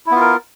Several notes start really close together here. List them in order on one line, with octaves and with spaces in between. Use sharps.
E4 B3 F4 A#4